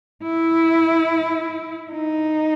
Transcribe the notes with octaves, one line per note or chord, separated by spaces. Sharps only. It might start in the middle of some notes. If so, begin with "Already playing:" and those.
E4
D#4